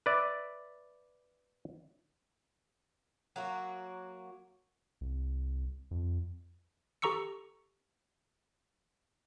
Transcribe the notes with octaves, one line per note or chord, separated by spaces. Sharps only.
B4 D5 E5
F#3 A#3 F#4
C2
F2
G4 A4 A#5 C#6 E6 C#7